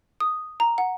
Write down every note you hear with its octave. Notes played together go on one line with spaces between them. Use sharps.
D#6
A#5
F#5